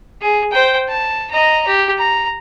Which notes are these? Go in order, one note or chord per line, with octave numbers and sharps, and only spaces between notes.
G#4
C5 G5
A5
D#5 A#5
G4
A#5